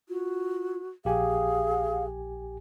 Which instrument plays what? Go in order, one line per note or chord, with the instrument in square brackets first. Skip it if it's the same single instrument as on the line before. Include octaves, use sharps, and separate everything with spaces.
[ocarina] F4 [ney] F#4
[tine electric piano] A#1 G4 G#5 [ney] G#4 [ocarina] F5